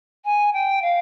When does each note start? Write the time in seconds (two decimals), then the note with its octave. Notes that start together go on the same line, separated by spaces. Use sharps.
0.25 G#5
0.53 G5
0.82 F5